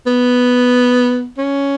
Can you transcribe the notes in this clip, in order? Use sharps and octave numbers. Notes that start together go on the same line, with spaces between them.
B3
C#4